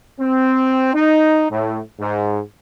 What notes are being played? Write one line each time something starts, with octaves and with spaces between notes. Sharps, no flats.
C4
D#4
A2
G#2